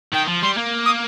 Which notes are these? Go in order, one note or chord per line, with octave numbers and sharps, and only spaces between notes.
D#3 G5
F3
G3 C6
A#3
D#6